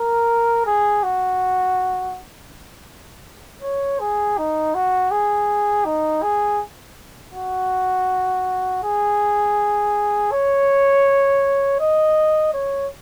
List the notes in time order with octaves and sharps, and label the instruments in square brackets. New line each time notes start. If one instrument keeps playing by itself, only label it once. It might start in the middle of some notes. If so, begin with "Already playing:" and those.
Already playing: [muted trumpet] A#4
G#4
F#4
C#5
G#4
D#4
F#4
G#4
D#4
G#4
F#4
G#4
C#5
D#5
C#5